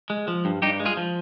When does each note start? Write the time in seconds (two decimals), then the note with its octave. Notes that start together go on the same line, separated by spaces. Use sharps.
0.10 G#3
0.28 F3
0.45 G2
0.62 G2 D#4 G4
0.80 G#3
0.86 F4 G#4
0.97 F3